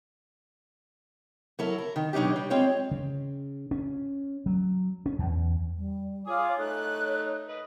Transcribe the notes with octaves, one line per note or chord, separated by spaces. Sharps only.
F#3 E4 A4 A#4
A#4
D#3
B2 F#3 D4 D#4 G4
G3
G#3 C4 F4 C#5 D5
C#3
C#4
F#3
C#4
E2
G3
F4 C#5 G#5 D6 D#6
A3 D#4 C#5 F#6
B4 D#5